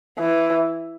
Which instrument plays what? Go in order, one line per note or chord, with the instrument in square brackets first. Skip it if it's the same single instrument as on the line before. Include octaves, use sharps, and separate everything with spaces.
[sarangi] E3